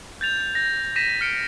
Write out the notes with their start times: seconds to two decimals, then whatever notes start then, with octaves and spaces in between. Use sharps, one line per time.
0.21 G6 A6 F7
0.55 G6 A#6
0.96 A#6 B6 D#7 E7
1.21 F6 C#7 D7